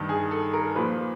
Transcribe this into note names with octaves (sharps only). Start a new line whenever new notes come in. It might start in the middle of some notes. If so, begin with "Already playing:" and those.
Already playing: G2 D#3
G#4
A4
A#4
A#2 F3 B4